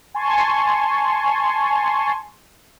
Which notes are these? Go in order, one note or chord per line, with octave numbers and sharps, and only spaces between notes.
G#5 A5 C6 C#6